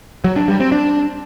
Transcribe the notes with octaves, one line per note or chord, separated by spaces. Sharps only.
F#3
D4
G3
C4
D4